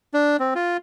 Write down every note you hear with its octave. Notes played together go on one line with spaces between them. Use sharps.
D4
C4
F4